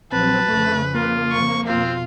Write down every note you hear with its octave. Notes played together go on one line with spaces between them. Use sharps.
A#1 F3 F#3 C4 B4 A5
F2 C#3 F3 A3
A#3 F4
F2 C#3 F3 C#6
F2 B2 C4 F4